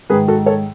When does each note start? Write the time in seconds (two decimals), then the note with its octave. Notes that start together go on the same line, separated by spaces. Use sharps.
0.10 G#2 D#3 G#3 G#4 B4
0.28 F#4 A4
0.46 A4 C#5